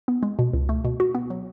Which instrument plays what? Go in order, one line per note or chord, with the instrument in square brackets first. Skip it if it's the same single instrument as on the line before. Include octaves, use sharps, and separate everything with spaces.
[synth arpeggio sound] B3
G#3
B2
C#2
A3
B2
F#4
B3
F#3